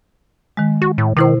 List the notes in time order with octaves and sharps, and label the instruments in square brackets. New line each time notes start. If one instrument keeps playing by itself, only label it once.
[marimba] D#3 G#3
[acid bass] F#4
A2
[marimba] B2 E4 C5 [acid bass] D#3